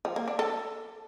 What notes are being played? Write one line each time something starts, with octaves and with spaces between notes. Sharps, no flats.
F3
A#3
D4
A4